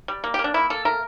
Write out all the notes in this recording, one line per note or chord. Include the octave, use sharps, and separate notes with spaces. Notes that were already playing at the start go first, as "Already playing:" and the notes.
G3
A#3
G4
A#3
D4
A#3 E4
A#3 A4
A3 A#4